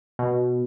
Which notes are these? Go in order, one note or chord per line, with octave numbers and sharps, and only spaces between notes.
B2